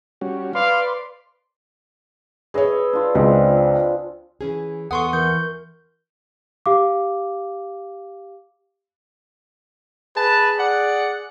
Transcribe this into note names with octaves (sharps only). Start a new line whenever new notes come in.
G3 C#4 F#4
B4 D5 F5 C6
G#4 B4 C#5 D#5 E5
D4 F4
C#2 C4 G#4 D5
E3 C#4 G#4
E2 B3 A4 F#5 C6 C#6 D#6
E3 A#4 G6
G4 F5 D6
G#4 B4 A5
D5 F#5